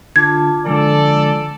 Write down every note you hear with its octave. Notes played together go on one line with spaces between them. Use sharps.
D3 F4 A5 D6 G#6
D3 F3 G#3 A4 D5